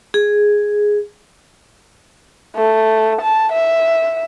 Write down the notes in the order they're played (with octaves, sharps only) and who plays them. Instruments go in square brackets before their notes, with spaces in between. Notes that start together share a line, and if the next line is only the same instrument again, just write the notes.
[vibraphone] G#4
[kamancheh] A3
A5
E5